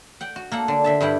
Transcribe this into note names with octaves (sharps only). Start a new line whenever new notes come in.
F#5 G5
F#4
A#3 A4 F#5
D3
D3 E5 A5
G2 G3 E4 F#5 G5